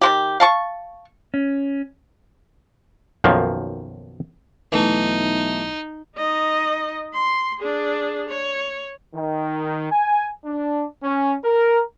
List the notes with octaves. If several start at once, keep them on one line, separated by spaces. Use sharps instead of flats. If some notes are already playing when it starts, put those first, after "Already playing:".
D#3 F3 G4
F5 A5 C#6
C#4
B1 F#2 D#3 F3 A#3
B1 E3 A3 D#4
D#4 D#5
C6
D4 G#4
C#5
D#3
G#5
D4
C#4
A#4